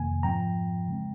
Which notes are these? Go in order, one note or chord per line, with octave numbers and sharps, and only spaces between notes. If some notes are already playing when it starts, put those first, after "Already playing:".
Already playing: F2 C3 D#3 A#3 G#5
G#2 F3 C4 G5 A#5
C#3 G#3 C4